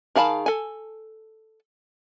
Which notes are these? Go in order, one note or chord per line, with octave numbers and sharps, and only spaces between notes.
D#3 G#4 F5 A5 B5
A4 G#5